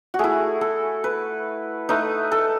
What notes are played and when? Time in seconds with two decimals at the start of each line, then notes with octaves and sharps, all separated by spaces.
0.14 F#4
0.19 A3 E4 G#4
0.61 A4
1.04 B4
1.89 A3 D#4 B4
2.31 A4